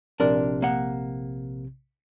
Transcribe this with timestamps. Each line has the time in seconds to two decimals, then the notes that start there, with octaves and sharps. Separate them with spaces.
0.20 A#1 C3 D4 A#4
0.62 A#3 F#5